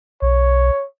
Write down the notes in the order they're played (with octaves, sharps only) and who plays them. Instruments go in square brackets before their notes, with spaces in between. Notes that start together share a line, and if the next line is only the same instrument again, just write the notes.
[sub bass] B1 [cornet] C#5